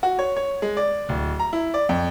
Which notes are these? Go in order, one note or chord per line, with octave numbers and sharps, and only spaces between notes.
F#4
C#5
C#5
G#3
D5
D1
A#5
E4
D5
F2